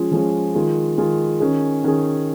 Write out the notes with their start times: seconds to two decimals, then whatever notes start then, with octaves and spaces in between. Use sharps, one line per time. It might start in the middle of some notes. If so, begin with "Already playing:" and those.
Already playing: F3 G#3 C#4 F4 G#4
0.12 F3 G#3 C#4 F4 G#4
0.55 D#3 G#3 F4 G#4
0.98 D#3 G#3 F4 G#4
1.40 D#3 C#4 G#4
1.84 D#3 C#4 G#4